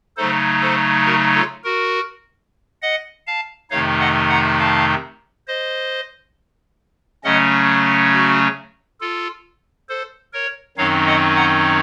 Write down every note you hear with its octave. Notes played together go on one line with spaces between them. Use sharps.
C#3 F#3 A3 D#4 A4 C5
A4 C5
F#4 A#4
F4 A4
F#4 A#4
D#5 F#5
F5 A5
F2 C3 D#3 A3 D#4 C#5 F5
D#5 F#5
F#5 A#5
F5 A5
C5 D#5
C#3 F#3 A3 C#4 D#5 F#5
F#4
F4 A4
A4 C5
A#4 C#5
F#2 D#3 F#3 C4 D#4 C#5 F5
D#5 F#5
F#5 A#5